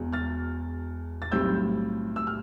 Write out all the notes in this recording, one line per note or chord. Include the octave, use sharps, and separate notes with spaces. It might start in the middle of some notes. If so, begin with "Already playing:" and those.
Already playing: E1 E2 B2
F6 A6
A6
B1 A2 G3 C4 E6 G6
E6
F6